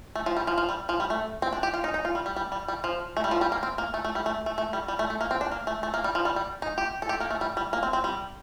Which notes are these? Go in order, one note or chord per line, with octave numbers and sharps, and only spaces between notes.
A3
F3
G3
F3
F3
G3
F3
G3
A3
C4
D4
G4
F4
D#4
D#4
F4
G3
G3
G3
G3
G3
F3
A3
G3
F3
G3
A#3
C4
A#3
A3
A3
G3
A3
A3
A3
G3
G3
A3
A3
A#3
C4
D4
A#3
A3
A3
A#3
G3
F3
G3
G3
D#4
G4
A4
G4
A#3
A3
G3
G3
A#3
C4
C4
G3